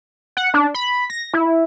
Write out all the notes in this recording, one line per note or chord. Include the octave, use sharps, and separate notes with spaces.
F#5
D4
B5
A#6
E4